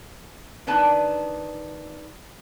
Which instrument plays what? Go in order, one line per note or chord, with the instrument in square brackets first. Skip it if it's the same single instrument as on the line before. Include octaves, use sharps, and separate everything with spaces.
[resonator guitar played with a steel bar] D#3 D4 B4 A5